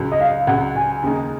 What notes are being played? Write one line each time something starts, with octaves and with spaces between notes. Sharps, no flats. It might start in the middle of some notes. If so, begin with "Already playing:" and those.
Already playing: C#2 C#3 F#3
D#5
F5
C#2 C#3 F#3 F#5
G#5
D#2 C#3 G#3 D#4